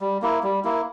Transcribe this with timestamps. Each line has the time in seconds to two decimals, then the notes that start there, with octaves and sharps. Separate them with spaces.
0.01 G3
0.22 A#3 E4
0.43 G3
0.64 A#3 E4